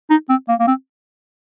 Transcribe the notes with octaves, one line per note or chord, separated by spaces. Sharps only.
D#4
C4
A#3
A#3
C4